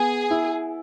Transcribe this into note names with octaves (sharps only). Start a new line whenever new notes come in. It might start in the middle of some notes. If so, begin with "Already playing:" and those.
Already playing: B3 G#4
E4